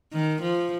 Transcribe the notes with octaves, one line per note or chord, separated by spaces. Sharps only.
D#3
F3